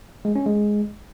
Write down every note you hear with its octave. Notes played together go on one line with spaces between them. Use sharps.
G#3
C#4
G#3